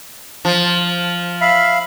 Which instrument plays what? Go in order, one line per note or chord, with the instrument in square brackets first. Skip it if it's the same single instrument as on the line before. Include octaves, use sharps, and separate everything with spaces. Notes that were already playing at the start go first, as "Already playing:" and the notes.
[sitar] F3
[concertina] E5 F5 B5